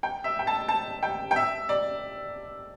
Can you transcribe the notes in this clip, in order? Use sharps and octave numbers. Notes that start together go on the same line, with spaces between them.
G5
E5
G5
A5
A5
G5
G5
E5
D5